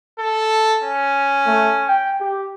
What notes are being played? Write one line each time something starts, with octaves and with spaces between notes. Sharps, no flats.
A4
C#4
A3
G5
G4